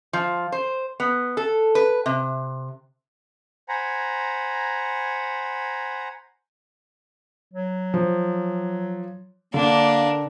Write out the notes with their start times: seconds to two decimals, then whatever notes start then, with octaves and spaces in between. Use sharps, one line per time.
0.13 F3
0.52 C5
1.00 B3
1.37 A4
1.75 B4
2.06 C3
3.69 C5 F#5 G#5 A#5 B5
7.53 F#3
7.94 F3
9.54 D3 A#3 D4 A#4